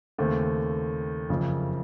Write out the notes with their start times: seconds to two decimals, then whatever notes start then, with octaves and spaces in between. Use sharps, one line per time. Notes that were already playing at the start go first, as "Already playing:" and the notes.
0.18 D#2 C#3 A3 C4
1.29 F#1 F2 C#3